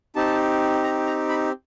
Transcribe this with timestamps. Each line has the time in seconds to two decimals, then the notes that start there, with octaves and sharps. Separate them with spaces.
0.16 C4 D#4 G4 A5
0.83 A#5
1.06 A#5
1.29 B5